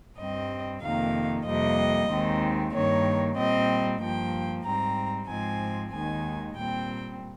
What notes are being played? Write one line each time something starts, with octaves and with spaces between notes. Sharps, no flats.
G2 G3 C4 D#5
F2 C3 D#3 A#3 F5
F2 C3 G3 A#3 D#5
D#2 D#3 G#3 C4
G2 D#3 A#3 C#5
A#2 G3 C4 D#5
G2 F3 A#3 G5
G#2 G3 C4 A#5
G#2 F3 G#3 C4 G#5
D#2 D#3 G#3 G#5
A#2 G3 C4 G5